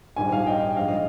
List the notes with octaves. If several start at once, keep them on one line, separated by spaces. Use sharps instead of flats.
A#1 G#2 D#3 G3 G#5
F5 G#5
D#5 G5
A#1 G#2 F3 G#3 F5
D#5